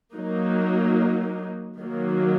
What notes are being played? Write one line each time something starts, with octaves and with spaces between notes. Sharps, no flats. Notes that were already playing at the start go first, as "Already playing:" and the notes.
F#3 A#3 D#4
D#3 F#3 A#3